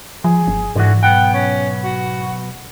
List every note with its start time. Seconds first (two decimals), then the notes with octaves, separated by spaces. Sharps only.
0.24 F3 G#4
0.48 G1
0.76 G#2 D3 E3 F#4
1.03 B1 B3 F#5 G5
1.34 C#4
1.84 F#4